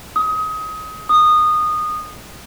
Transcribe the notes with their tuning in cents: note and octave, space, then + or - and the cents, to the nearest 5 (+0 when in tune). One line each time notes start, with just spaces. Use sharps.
D#6 +25
D#6 -20